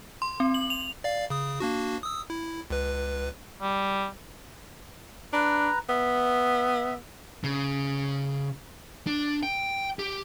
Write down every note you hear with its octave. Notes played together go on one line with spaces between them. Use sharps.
C6
C4
F#7
F7
D5 F5
C#3 D#6
A#3 D4 F#4
D#6 E6
E4
C#2 B4
G3
D4 B4 A#5
B3 E5
C#3
D4
G5
G4